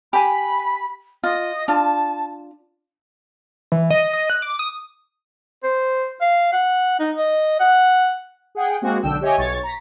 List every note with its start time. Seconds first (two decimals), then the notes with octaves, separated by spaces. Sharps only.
0.13 G4 G#5 B5
1.24 F4 D#5
1.68 D4 F4 A5
3.72 E3
3.90 D#5
4.13 D#5
4.30 F#6
4.42 D6
4.59 D#6
5.63 C5
6.21 F5
6.53 F#5
6.99 D#4
7.17 D#5
7.60 F#5
8.55 G#4 F#5 G5
8.81 G#3 A#3 C4 F#4
9.03 B1 D3 D4 G5 E6
9.21 G4 C#5 D#5 E5 G5 G#5
9.37 B1 C#5 C#6 A6
9.63 A#5 B6